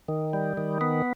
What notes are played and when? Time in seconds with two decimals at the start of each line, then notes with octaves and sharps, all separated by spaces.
0.08 D#3
0.33 G3
0.57 D#3
0.81 B3